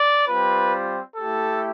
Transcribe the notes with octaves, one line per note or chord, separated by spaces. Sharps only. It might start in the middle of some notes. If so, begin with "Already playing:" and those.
Already playing: D5
G3 C4 F4 B4
A3 E4 G4 A4